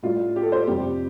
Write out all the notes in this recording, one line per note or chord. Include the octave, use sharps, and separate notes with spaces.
A2 G3 F4
G4
A4
C5
F2 C3 G3 G4